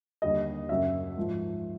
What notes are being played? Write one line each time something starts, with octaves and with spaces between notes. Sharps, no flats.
D#2 D3 G3 D#5
F#2 C#3 F#3 E5
G#2 F3